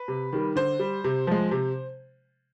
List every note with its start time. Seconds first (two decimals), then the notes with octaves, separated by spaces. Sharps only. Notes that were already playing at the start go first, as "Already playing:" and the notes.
Already playing: B4
0.08 C3
0.33 D#3 G3
0.56 D3 C5
0.79 G3
1.04 C3
1.27 F3 G#3
1.51 C3